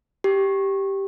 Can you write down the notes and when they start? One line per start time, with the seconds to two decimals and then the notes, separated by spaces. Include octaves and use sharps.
0.24 G4